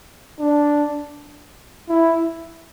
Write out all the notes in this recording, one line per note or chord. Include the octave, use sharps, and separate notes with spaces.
D4
E4